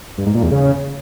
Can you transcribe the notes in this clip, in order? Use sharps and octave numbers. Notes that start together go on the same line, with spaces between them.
G2
G#2
A#2
E2
C#3